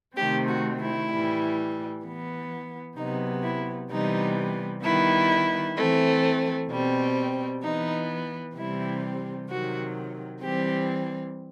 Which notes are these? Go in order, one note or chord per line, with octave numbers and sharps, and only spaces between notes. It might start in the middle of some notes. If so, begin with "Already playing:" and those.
C3 D#3 A3 C4 G4
F#4
E4
A2 E3 G3
E3 B3
C3 F#3 B3 D#4
E4
C3 E3 G3 B3 D#4
D#3 G3 B3 E4
E3 A3 C4
B2 G3 C4
E3 B3 D#4
C3 E3 G3 C4 E4
C3 D#3 F#3 F#4
E3 G3 C4 G4